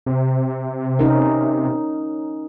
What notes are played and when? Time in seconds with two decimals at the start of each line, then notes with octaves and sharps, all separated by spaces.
0.06 C3
0.99 C#4 D#4 A#4